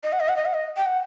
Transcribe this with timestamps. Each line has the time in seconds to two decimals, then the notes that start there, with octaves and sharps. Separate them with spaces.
0.03 D#5
0.12 F#5
0.20 D#5
0.28 F#5
0.36 D#5
0.45 F#5
0.54 D#5
0.77 G5
0.86 F#5